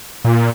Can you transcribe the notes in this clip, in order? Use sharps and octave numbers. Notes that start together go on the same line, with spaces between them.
A#2